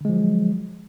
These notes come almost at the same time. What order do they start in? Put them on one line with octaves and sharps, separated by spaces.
D3 G#3 F3 F#3